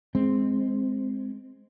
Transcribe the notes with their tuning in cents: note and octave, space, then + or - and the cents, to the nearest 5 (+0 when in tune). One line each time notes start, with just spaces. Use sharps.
G#3 +0 C4 -5